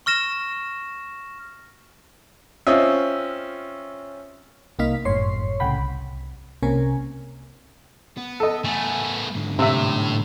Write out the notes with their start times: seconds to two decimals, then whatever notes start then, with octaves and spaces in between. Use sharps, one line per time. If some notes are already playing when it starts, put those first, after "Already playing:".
0.06 C#6 F6 A#6 E7
2.67 C4 C#4 F4 D#5 E5
4.79 C2 A#3 D#4 F5 B6
5.05 G1 F#2 A2 C#5 C6 C7
5.60 C2 A2 C#3 F#5 G5 B5
5.78 C2
6.63 C2 C3 A#3 C#4 A#4 G#5
8.17 B3
8.40 A4 D#5
8.65 A3 B3 G#5
9.35 G#2 D3
9.59 A2 C3 E5